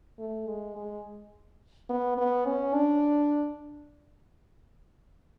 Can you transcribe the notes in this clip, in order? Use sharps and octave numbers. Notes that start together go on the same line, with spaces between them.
A3
G#3
G#3
B3
B3
C#4
D4